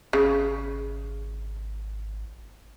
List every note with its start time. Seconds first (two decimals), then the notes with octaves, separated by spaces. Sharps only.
0.13 G#1 C#3